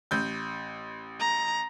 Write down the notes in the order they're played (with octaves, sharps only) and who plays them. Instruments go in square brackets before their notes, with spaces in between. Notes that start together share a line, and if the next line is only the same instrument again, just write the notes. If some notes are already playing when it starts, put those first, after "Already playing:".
[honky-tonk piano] A1 G6
[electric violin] A#5